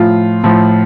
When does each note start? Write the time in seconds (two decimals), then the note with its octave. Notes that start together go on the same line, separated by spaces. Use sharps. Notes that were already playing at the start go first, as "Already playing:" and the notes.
Already playing: A2 F3 F4
0.44 A2 F3